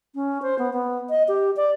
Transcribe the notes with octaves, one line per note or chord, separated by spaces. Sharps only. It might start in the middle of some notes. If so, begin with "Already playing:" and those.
C#4
C5
B3
B3
D#5
G4
D5